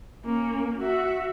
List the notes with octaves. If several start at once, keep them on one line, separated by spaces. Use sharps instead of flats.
A#3 C#4
F#4 E5